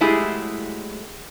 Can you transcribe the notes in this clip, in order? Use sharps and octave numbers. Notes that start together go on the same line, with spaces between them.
F#3 G#3 A3 E4 G4 G#4